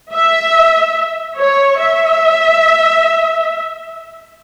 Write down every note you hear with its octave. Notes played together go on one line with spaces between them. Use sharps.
E5
C#5
E5